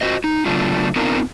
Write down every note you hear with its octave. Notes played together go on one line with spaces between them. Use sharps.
F4 F#4 C5 D#5
D#4
C#3 F#3 A3 B3 D4 F4
B3 C4 D4 D#4 F4 A#4